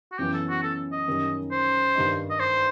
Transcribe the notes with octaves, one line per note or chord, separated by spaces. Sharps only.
F#4
F#2 E3 B3 G4
A4
F#4
A4
D#5
F#2 D#3 G3 D#4
C5
G2 D#3 G3 D#4
D#5
C5